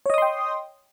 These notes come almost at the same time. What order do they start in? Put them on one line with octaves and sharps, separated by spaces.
C#5 D#5 D#6 C6 G5